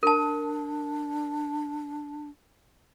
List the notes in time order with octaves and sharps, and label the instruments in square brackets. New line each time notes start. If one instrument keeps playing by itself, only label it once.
[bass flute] D4 [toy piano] A#4 A5